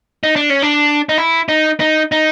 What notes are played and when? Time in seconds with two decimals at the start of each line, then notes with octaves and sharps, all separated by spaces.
0.24 D#4
0.36 D4
0.50 C#4
0.62 D4
1.09 D#4
1.18 E4
1.49 D#4
1.80 D#4
2.12 D#4